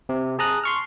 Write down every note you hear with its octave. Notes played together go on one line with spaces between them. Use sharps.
C3
G#4 A5 A#5 D#6 F#6
C6 C#6 F6